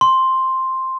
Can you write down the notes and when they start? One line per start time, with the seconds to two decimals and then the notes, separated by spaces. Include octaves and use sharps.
0.01 C6